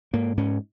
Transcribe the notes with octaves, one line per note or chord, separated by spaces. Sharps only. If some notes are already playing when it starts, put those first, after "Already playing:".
G#2 A#3
G#2 C#4